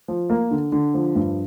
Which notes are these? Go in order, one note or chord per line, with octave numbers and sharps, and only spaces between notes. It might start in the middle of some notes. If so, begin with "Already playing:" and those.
F3
A#3
D3
D3
F3
G2